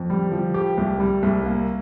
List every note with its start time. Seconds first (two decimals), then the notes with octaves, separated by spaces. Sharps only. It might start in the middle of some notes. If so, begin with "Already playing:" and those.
Already playing: F2
0.10 G3
0.32 F3
0.54 G4
0.78 C2
1.00 G3
1.23 C2
1.46 A#3